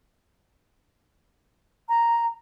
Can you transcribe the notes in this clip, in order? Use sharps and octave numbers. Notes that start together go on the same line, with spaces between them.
A#5